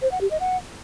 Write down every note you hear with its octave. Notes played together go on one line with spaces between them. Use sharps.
C5
F#5
G4
D#5
F#5